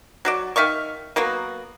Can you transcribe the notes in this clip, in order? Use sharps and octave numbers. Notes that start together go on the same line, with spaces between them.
F#3 F#4 D5
D#3 E5 F5 C#6
F#3 A#3 B3 F#4